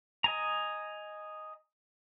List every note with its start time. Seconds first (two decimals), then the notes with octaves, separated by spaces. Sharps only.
0.24 D#5 G#5 A#5